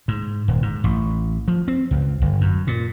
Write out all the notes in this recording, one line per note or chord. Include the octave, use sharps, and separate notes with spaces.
G#2
D#1
G#2
A1
F3
C4
C#2
G1
F#2
A#2